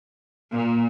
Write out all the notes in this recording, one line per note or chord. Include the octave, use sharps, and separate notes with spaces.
A#2